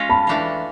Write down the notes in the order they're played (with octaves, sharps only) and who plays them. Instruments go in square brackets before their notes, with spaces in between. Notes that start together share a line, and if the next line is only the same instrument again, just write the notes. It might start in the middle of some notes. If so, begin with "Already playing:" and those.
Already playing: [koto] G#3 C#4 F4
[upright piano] A5 B5
[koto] E3 A3 D4 F4